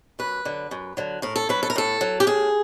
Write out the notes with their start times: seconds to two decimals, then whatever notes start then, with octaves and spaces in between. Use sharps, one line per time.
0.19 F#2 B4
0.45 D3 F#3
0.71 F#2
0.97 D3 F#3
1.22 A2 A#4
1.36 A4
1.49 F#3 B4
1.63 A4
1.70 A#4
1.76 A2 A4
2.01 F#3
2.20 G4
2.27 A2 G#4